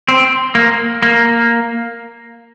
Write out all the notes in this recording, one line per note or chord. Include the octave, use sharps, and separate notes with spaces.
C4
A#3
A#3